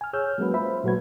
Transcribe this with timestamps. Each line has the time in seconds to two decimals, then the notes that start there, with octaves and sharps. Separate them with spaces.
0.01 G#5 F6
0.13 G#4 C#5 E6 F6 G6
0.38 F#3 G#3 A#3 C#4 F#4 B4
0.54 F4 C5 E5 B5
0.84 A#2 F#3 A3 F#4 B4 G#6